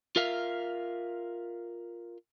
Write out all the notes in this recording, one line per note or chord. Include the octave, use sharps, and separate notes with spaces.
F4 A#4 E5 F5